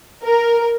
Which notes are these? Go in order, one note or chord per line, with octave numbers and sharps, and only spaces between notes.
A#4